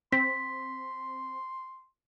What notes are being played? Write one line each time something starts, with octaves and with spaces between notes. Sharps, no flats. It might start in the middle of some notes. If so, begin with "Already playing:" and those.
C4 C6 B6